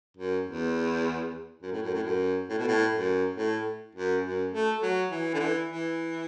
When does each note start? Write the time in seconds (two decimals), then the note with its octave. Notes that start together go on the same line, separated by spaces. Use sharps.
0.17 F#2
0.47 E2
1.62 F#2
1.72 A2
1.83 F#2
1.94 A2
2.04 F#2
2.50 A2
2.59 B2
2.68 A2
2.93 F#2
3.36 A2
3.95 F#2
4.24 F#2
4.52 A3
4.82 F#3
5.11 E3
5.34 D3
5.40 E3
5.69 E3